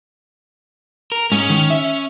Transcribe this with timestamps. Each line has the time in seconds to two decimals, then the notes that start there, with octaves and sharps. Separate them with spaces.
1.12 A#4
1.32 G#2 C#4
1.49 D#3
1.70 E5